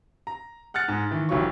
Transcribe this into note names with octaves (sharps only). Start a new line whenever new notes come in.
A#5
F#5 F6 F#6 A6 C#7
G#2
D#3 E3
F1 E3 F#3 F4 C#6